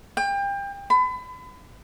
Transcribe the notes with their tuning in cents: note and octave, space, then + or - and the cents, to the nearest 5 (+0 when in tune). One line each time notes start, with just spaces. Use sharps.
G5 +30
B5 +35